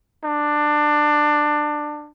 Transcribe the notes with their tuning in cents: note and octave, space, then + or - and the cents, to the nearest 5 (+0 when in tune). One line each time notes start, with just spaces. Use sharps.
D4 +20